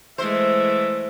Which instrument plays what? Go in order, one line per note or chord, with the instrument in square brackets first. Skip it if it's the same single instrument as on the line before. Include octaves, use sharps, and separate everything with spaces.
[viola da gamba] E3 G#3 A3 [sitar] C5 [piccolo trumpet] E5